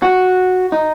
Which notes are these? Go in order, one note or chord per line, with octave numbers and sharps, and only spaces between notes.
F#4
D#4